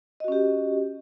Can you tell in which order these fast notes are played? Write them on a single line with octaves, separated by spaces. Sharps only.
D#5 F#4 C#4 G4